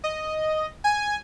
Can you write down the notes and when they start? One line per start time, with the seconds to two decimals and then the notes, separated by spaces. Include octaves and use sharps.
0.04 D#5
0.84 G#5